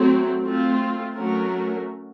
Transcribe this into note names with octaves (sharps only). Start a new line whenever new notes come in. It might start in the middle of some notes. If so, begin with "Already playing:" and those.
Already playing: F#3 A3 C4
A3 C4 F4
F#3 A3 C#4 F#4 A#4